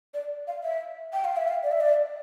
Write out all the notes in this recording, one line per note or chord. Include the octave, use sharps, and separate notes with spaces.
D5
F5
E5
G5
F5
E5
F5
D5
E5
D5